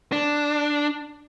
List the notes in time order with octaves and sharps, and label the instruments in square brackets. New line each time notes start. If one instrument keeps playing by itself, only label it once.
[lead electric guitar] D4